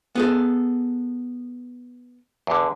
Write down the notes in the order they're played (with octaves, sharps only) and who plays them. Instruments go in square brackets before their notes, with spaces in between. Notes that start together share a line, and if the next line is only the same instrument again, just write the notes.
[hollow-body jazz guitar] B3 G#4 A4
[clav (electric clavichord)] E2 D3